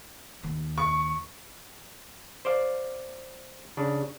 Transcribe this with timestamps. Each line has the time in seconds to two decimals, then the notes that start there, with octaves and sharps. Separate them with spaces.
0.43 D#2
0.78 C#6
2.45 C5 D5 F5
3.77 C#3 D4